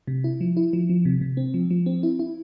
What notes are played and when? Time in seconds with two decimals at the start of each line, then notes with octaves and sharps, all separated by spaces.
0.07 C3
0.24 E4
0.41 F3
0.57 E4
0.73 F3
0.90 F3
1.05 C3
1.21 C3
1.37 C4
1.54 F3
1.71 F3
1.86 C4
2.03 E4
2.19 E4